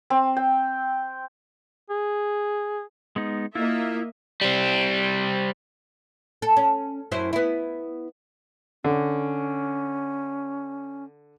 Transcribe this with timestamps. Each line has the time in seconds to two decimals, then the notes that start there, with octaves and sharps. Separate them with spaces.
0.10 C4
0.37 G5
1.90 G#4
3.16 G#3 B3 D#4
3.55 A#3 E4 F4 D#5 E5
4.41 G3 C4
6.42 A4
6.57 C#4
7.12 F#2 E4 C5
7.33 B3 E4
8.84 D3 C#4